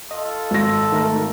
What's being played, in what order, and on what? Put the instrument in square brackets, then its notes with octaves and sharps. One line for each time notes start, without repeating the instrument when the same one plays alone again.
[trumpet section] F4 A4 [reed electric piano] D#5
[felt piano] G#1 A#6
[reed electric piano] D#3 A3 A#4